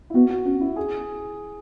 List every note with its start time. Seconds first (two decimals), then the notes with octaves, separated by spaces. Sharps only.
0.10 E4
0.15 B3 F#4
0.31 F#4
0.46 C#4 F#4
0.61 E4
0.76 G#4